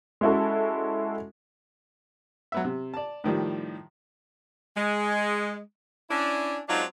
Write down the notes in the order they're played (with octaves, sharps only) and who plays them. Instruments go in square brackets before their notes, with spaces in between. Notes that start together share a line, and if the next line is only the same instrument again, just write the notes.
[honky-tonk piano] G#3 C#4 E4 F#4 A4
[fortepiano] F#3 B3 E5
C3
D5 A5
A2 D#3 F3 G3
[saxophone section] G#3
C#4 D4 E4
F#3 G#3 C4 D4 D#4 F4